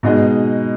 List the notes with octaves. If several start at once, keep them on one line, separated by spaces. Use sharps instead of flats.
B2 G#3 D#4 G#4 D#5